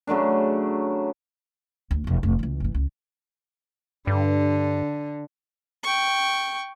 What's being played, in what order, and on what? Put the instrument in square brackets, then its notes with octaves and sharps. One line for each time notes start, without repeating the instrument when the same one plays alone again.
[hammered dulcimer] C#3 F#3 A3 D4
[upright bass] D2
E1 F3
F1 A2
C#2 E3
F#1 E3
C#2
[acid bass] G2 [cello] D3
[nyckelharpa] G5 C#6